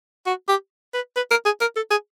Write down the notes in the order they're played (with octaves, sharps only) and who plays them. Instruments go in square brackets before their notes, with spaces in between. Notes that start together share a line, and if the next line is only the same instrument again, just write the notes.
[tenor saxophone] F#4
G4
B4
B4
A#4
G#4
A#4
A4
G#4